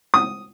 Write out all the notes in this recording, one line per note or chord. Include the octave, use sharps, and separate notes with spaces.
D#6